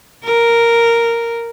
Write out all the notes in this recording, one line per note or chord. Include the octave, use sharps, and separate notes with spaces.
A#4